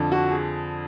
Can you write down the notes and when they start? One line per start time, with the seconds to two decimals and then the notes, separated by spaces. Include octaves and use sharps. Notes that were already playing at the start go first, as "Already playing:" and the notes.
Already playing: F2 D3 F3
0.12 F#4
0.31 G#4